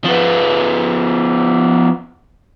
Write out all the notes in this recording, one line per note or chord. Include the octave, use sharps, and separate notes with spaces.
F3 B3